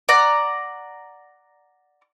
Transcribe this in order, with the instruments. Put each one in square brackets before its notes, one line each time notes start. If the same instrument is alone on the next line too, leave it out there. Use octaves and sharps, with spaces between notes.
[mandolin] D5 F#5 A#5